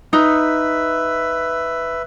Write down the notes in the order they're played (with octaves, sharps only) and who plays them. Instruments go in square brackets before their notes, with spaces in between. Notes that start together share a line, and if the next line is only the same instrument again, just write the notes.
[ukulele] D#4 [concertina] B4 E5